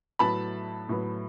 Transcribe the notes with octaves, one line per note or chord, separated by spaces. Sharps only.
A2 F#3 B3 A5 B5
A2 F#3 B3